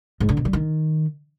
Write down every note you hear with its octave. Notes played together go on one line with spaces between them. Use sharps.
G#2
D3
B2
G3
D#3